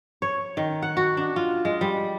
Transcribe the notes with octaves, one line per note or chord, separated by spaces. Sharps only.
C#5
D#3
F#5
F#4
D4
F4
G#3
G3